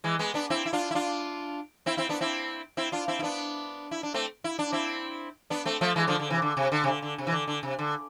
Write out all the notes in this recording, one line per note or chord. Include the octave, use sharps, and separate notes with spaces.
E3 G#3
G#3 B3
B3 D4
C4 E4
E4
D4 F4
E4
D4 F4
C4 E4
C4 E4
B3 D4
C4 E4
C4 E4
D4 F4
C4 E4
E4
B3 D4
E4
D4
A3 C4
E4
D4
C4 E4
B3 D4
A3 C4
F3 A3
E3 G#3
D3 F3
D3
C3 E3
D3
C3
D3
C3
D3
D3
C3
E3
D3
D3
C3
D3